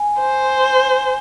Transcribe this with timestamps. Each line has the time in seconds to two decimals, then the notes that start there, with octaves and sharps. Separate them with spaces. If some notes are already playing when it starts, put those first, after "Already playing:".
Already playing: G#5
0.19 C5